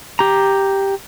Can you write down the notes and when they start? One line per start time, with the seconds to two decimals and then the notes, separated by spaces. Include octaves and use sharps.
0.19 G4 A#5